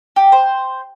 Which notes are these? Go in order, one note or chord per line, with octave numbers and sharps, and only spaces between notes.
G4
C5